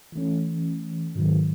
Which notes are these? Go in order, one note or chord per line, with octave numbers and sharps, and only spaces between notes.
E3 A3 C#4
G#2 D#3 F#3